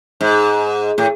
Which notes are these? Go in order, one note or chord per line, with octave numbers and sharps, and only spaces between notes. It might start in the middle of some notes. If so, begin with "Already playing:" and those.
G#2
A2